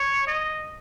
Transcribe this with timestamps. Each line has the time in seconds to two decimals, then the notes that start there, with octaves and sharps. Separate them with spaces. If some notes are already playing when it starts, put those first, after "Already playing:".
Already playing: C#5
0.27 D#5